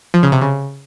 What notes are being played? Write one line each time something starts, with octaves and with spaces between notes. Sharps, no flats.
F3
C#3
C3
C#3